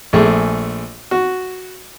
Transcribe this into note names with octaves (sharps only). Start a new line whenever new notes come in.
A#1 A3 G#4
F#4